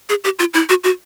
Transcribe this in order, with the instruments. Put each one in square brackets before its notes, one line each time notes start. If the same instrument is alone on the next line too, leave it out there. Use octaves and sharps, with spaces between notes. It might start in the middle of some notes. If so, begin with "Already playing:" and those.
[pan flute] G#4
G4
F4
E4
F#4
F#4